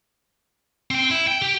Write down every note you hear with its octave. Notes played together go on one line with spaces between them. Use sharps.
C4 G5
E4
G5
G4